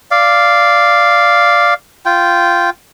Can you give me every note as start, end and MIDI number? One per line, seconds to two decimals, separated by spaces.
0.11 1.74 74
0.11 1.74 77
2.06 2.70 65
2.06 2.70 79